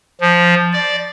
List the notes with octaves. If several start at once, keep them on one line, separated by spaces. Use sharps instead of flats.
F3
D5